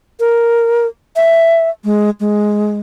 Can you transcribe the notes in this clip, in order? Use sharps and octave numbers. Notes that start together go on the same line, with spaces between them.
A#4
E5
G#3
G#3